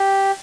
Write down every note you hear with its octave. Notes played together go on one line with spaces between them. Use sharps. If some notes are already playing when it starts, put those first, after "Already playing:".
Already playing: G4